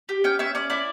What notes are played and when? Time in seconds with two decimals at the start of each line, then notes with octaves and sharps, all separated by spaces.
0.09 G4
0.24 C#4 G5
0.39 C#4 E5
0.55 C#4 D5
0.70 E4 D5